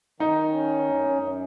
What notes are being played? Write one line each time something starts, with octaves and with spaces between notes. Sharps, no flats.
D#3 D#4
C#4
F#2
F#2